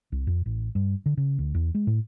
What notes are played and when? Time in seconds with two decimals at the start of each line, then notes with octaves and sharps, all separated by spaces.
0.12 C2
0.27 F2
0.46 A1
0.75 G2
1.06 D3
1.17 C#3
1.39 D2
1.55 E2
1.75 G#3
1.87 A2